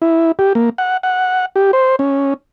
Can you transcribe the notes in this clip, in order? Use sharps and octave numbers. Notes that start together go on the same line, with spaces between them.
E4
G4
A#3
F#5
F#5
G4
C5
C#4